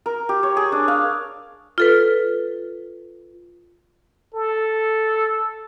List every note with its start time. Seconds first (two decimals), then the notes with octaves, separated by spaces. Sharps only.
0.06 A#4
0.29 G4
0.43 C#5
0.57 G#4
0.72 D4
0.88 F5
1.78 F4 A4 B4
4.34 A4